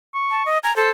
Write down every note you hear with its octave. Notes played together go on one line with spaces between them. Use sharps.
C#6
A5
D#5
G#5 A#5
A4 C5